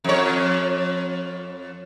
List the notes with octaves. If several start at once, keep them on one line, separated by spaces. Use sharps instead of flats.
F2 C#5